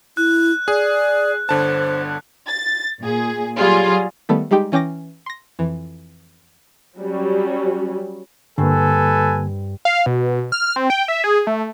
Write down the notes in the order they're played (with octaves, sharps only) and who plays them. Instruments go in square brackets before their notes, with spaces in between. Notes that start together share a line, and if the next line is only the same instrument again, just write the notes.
[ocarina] E4 [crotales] F#6
[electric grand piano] G#4 [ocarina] D5
[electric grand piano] G1 D3 A5 [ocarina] C5
[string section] A6
A#2 G#4
F#3 G3 F4 G#4
[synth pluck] D#3 G3 A3 B3 A4
G3 G#3 D#4 G4 G5
E3 C#4 G5 D6 A#6
C6 A#6
F2 E3
[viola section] F#3 G3 C#4
[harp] G2 C4 [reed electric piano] D3 A#3 [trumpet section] A4 B4 G#5
[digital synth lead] F5
B2
F6
C4
G5
E5
G#4
A3